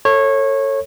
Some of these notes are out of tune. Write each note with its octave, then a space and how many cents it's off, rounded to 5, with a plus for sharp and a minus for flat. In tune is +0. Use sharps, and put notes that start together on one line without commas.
A4 +25 C#5 -20